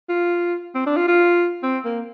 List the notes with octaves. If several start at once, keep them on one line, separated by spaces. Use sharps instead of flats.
F4
C4
D4
F4
F4
C4
A#3